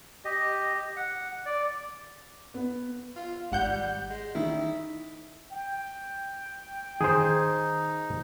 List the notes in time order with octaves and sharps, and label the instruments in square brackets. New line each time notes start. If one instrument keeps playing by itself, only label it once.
[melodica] G4 D#5
F#5
D5
[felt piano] B3
[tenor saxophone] F4
[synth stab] G#1 F#5 G6 [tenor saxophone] G3
[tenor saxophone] G#3
[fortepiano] D#3 [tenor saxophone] E4
[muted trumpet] G5
[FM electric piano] D#3 [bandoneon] D#4 [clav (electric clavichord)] G#4 C5